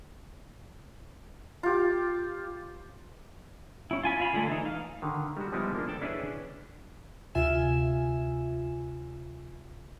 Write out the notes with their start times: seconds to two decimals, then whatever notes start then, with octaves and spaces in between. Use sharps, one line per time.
1.63 F4 G4
3.91 C#4 E4
4.03 F4 G#5 B5
4.20 F4 F5 B5
4.33 D3 G#3 A3
4.47 E3 D#4
4.66 F5
5.02 D3 D#3
5.37 G3 G#3 F#4
5.52 F3 G3 G#3 B3 D#4 E4
5.75 A#3 D4
5.88 A4 D5 G5 A5
6.01 C#4 D4 E4 G#4 B4 D5
7.35 D2 C3 F4 E5 G#5 E7